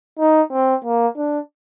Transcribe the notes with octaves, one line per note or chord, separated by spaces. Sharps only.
D#4
C4
A#3
D4